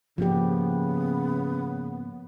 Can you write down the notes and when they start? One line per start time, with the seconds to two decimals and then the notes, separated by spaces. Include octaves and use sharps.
0.18 G#2 C#3 F3 A#3 B3 G4